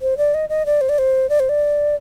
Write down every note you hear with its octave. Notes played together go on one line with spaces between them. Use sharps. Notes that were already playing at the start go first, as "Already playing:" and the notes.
C5
D5
D#5
D#5
D5
C5
D5
C5
D5
C5
D5